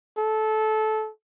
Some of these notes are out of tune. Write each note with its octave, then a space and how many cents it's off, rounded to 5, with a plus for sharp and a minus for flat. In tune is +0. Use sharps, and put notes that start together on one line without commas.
A4 -20